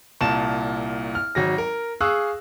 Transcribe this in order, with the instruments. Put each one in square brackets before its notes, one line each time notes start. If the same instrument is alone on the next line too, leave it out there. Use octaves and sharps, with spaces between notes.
[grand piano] C2 A#2 A5 E7
F6
G#1 F#3 A#6
A#4
G#4 F5 C#6 D#6 E6 F#6